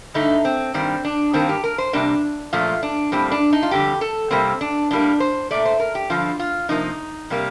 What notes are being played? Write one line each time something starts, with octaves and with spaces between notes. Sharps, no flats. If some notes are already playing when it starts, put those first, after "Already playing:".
G2 D3 A3 D#4
C4
G2 D#3 G3 C4
D4
G2 D#3 A#3 C4
G4
A#4
C5
C3 G3 A#3 D4
A#2 F3 A3 F4
D4
A2 G3 A#3 C4
D4
D#4
F4
F2 D3 G3 G4
A4
C3 G3 A#3 C4
D4
A2 G3 A#3 D4
C5
A#2 A3 D5
C5
A#4
G4
G2 D3 F3 F4
F4
C3 F3 A#3 D#4
C3 G3 A#3